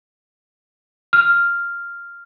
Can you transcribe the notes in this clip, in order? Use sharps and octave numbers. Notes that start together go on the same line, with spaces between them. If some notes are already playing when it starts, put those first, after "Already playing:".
F6